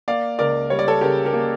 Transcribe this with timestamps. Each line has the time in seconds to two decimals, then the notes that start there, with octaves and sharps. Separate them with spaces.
0.08 A#3 D5 F5
0.39 C#2 A#4 D5
0.70 G3 C#5
0.79 D5
0.88 A4 C#5
1.01 C#3 G4 A#4
1.25 G4 A#4
1.33 A#3